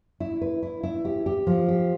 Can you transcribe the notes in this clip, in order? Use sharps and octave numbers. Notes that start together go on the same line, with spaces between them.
E4
B4
E4
E4
G4
G4
F3
G4